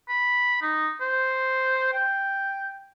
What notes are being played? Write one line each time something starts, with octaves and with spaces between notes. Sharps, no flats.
B5
D#4
C5
G5